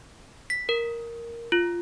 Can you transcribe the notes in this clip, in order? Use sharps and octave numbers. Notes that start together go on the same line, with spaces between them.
B6
A#4
F4